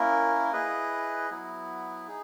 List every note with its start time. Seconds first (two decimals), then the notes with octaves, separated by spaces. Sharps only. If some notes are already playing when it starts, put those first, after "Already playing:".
Already playing: A#3 C#4 E4 A#4
0.53 E4 G#4 B4 D#5
1.30 F#3 B3 E4
2.07 D#4 G#4